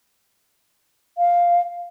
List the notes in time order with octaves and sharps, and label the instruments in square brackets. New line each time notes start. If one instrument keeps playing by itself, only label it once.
[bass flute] F5